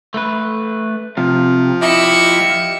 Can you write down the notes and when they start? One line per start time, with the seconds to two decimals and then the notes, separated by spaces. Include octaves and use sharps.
0.14 A3 B4
1.17 C3 F3
1.82 E4 G4 D#5 E5 C#7